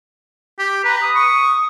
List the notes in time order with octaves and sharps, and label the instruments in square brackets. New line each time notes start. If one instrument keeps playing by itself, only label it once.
[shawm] G4
[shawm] B4 [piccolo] A#5
[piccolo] D#6
[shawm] C#6